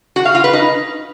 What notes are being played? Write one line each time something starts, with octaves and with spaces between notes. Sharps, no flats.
F#4
F5
F4
B4
D#4